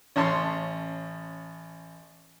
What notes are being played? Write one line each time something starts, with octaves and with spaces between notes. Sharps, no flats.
A1 C#4 A5 C6